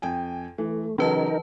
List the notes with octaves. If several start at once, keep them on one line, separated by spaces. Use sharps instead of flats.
F2 G5 G#5
E3 A3
C#3 E3 F#3 D#4 A#4 B4 A5